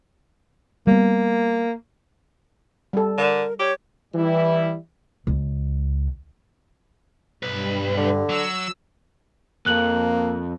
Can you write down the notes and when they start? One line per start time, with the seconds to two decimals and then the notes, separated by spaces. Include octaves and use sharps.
0.87 G3 A#3 B3
2.93 G3 A4
3.18 D3 A#4
3.59 G4 C#5
4.14 E3 G3 E4
5.27 C#2
7.43 B1 G2 B4
7.97 D3
8.29 F#3 E6
9.66 F2 A#3 F#6 F#7